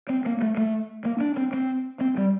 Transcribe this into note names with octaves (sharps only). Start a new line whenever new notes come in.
C4
A#3
A3
A3
A#3
D4
C4
C4
C4
G3